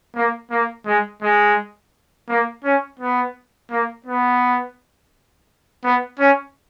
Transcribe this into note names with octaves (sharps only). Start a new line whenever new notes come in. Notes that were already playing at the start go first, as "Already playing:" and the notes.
A#3
A#3
G#3
G#3
A#3
C#4
B3
A#3
B3
B3
C#4